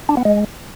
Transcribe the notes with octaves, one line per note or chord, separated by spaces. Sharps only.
D4
B3
G#3